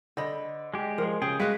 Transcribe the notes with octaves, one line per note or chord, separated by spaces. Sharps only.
D3 C5 D#5 B5
G#3 G4
F3 G#3 A#4
C#3 G4 G#4 G5
G#3 F#4 B4 C5 F5